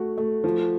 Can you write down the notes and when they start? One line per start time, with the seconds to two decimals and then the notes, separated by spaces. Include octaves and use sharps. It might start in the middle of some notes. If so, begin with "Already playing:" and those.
Already playing: A3 F#4
0.18 A3
0.44 F3